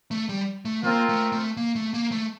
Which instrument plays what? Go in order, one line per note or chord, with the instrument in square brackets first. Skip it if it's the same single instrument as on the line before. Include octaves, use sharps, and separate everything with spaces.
[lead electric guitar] A3
G3
A3
[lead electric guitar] A#3 [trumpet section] C4 F4 A#4 F5
[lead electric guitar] A3
A3
A#3
A3
A#3
A3